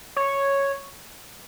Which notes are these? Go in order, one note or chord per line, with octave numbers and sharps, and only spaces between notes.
C#5